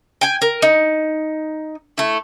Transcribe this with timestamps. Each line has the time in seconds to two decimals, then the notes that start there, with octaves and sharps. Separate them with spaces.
0.21 G5 G#5
0.42 A#4
0.62 D#4
1.98 A3 E4